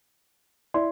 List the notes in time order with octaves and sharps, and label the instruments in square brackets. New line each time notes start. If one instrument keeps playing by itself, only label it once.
[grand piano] E4 [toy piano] D5 [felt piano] C6